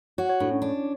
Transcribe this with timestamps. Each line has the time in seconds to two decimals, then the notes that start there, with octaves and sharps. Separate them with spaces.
0.18 F#4 C#5
0.29 C#5
0.40 A2 D4
0.51 C#4
0.62 D4